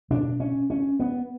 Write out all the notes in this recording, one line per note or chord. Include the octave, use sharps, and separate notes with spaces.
B2 D4
C#4
C#4
B3